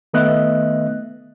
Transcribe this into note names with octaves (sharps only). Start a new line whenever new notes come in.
D#3 A3 B3 D#5 E5 F#6